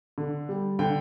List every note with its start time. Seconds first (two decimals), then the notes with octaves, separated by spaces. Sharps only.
0.18 D3
0.49 G3
0.79 D3 G5